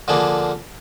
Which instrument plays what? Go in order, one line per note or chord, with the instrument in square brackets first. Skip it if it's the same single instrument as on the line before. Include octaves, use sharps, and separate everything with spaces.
[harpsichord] D3 F3 A#3 D4 G#4